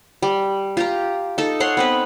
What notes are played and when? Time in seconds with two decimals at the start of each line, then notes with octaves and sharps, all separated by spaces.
0.22 G3
0.77 F4 G4 A#5
1.38 D#4 A4
1.60 C#5 F#5 C6
1.77 B3 C4 B4